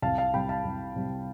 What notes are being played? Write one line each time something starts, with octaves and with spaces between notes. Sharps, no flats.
C2 F5 A5
F5 A5
C3 G3 G5 B5
F5 A5
C2
C3 G3